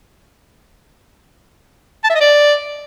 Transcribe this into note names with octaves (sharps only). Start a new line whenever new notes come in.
A5
E5
D#5
D5